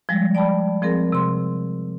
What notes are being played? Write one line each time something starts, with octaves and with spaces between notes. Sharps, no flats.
F3 G3 G#3 A#6
D5 G5 A5 B5
F3 C4 G#4 A#4
C3 C6